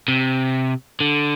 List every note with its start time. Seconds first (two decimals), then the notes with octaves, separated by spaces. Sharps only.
0.08 C3
1.00 D3